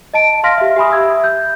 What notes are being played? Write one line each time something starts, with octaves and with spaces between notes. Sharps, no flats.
D#5 A5 D7
F5 C6 F6 A#6 B6
G4 E5
G4 G#5 B5 D#6
E5 E6 G#6
G6